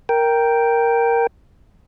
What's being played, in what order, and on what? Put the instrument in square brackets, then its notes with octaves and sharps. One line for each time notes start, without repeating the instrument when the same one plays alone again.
[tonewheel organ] A#4 G5